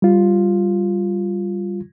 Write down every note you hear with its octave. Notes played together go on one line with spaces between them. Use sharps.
G3 F4